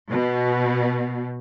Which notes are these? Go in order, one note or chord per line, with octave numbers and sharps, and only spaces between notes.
B2